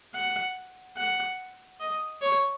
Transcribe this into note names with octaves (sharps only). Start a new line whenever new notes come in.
F#5
F#5
D#5
C#5